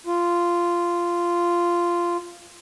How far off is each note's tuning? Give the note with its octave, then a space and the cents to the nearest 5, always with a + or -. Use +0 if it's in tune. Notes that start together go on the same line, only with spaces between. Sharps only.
F4 -10